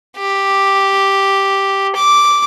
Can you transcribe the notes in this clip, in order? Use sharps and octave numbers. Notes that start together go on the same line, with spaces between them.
G4
D6